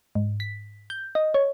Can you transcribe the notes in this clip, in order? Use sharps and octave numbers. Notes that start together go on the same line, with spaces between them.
G#2
B6
G6
D#5
C#5